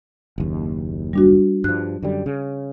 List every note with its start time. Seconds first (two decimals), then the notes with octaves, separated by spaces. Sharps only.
0.38 F#1 D#2
1.13 G3 D4 F#4
1.64 G2 F3 F#6
2.02 F#2 D3 G3
2.26 C#3